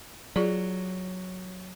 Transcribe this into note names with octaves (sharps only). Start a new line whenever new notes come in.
F#3 F4 G#4 D5